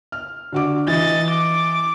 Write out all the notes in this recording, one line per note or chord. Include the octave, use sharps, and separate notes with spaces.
F6
D3 F#4 D6
E3 D#5 A6
D6